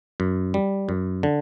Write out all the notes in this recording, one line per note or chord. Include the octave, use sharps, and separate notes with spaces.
F#2
G3
F#2
D3